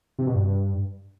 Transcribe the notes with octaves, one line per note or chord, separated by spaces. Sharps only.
C3
B2
G2